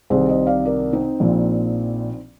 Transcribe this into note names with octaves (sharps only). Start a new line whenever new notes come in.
C2 C3 D#3 G#4 C5
C5 D#5
D5 F5
A#4 D5
C4 D#4
A#1 A#2 F3